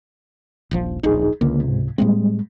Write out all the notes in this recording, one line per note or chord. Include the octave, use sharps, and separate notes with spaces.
D#1 A#1 F3
D1 A#1 D#4 G#4
C#2 D3 A#3
G#2 C3
A2 G3 G#3 A#3 C4